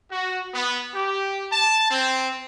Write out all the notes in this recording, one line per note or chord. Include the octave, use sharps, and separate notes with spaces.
F#4
B3
G4
A5
C4